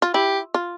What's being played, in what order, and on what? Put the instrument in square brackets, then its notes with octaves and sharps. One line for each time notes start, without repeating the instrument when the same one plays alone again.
[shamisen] F4
[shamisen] E4 [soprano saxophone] G4
[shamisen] F4